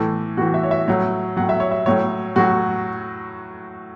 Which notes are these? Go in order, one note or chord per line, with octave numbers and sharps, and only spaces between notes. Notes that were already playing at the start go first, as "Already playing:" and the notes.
Already playing: A2 E3 A4
A2 E3 F#4
E5
C#5
E5
A2 F#3 C#5
A2 F#3 F#5
E5
C#5
E5
A2 F#3 C#5
A2 F#3 F#4